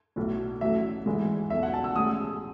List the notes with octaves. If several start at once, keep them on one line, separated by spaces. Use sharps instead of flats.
B1 A2 F#3 A3
A1 A2 F#3 A3 E5
G#1 G#2 E3 G#3
B1 B2 A3 E5
F#5
A5
E6
A1 A2 G#3 D#6